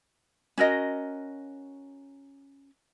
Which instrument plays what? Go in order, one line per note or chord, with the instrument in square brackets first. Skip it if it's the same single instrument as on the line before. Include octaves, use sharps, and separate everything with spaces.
[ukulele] C#4 F#4 A#4 D#5